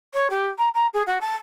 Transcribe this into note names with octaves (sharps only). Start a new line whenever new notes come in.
C#5
G4
A#5
A#5
G#4
F#4
A5